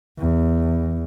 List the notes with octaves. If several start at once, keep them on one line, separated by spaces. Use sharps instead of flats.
E2